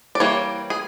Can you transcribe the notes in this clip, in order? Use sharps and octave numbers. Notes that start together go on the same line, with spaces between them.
D5
E3 G3 A#3 C#5
G#4